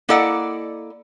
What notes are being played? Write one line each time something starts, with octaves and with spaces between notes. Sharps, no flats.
A#3 E4 A4 D5 D#5 F#5